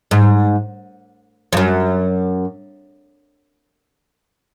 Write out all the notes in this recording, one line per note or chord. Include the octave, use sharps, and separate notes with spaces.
G#2
F2
F#2